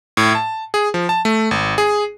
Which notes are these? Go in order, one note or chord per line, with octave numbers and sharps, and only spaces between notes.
A2
A5
G#4
F3
A5
A3
G#1
G#4